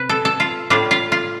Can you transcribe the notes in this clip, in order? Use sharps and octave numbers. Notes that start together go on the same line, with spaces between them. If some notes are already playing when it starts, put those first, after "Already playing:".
Already playing: C3 B4
A4
A4
F4
A2 G3 D4 F4
F4
F4